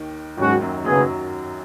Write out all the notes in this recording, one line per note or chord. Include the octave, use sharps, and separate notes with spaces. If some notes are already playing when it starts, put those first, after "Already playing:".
Already playing: D#2 D#3
D#2 G#2 D#3 F#3 C#4 F#4
F#2 F#3
F#2 C#3 F#3 B3 G#4
F#2 F#3